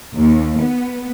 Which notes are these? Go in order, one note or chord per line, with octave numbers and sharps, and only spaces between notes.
D#2
B3